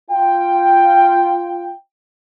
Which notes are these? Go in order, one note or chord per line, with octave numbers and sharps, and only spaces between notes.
F4 G5